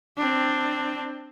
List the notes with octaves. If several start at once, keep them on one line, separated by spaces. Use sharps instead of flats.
C4 D4